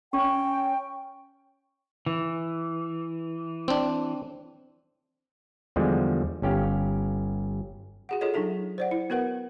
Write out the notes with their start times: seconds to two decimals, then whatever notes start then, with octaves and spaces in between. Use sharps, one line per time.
0.13 C#4 G5 C#6
2.06 E3
3.68 C4 D4
5.76 E2 D3 F3 G3 G#3
6.42 G1 C#4 G4 F5
8.09 F#4 G#4 F#5
8.21 F4 G#4 A4 C#5 D#5
8.34 F#3 D4 D#4 A4 E5
8.78 C5 D5 F#5
8.91 E4
9.10 B3 F#4 A#4 B4 F#5